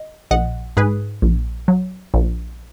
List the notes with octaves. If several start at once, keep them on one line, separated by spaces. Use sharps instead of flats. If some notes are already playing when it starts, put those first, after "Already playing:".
Already playing: D#5
A#1 D#5 F#5
G#2 G#4 B4
A#1
F#3
A#1